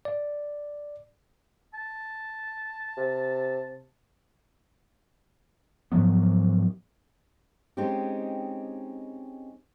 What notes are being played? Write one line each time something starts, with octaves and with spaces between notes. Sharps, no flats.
D5
A5
C3
G#2 F3 F#3 B3
G#3 C4 C#4 D#4 G4